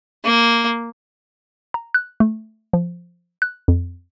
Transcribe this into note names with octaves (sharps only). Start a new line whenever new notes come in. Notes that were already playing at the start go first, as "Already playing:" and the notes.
A#3
A#5
F#6
A3
F3
F#6
F2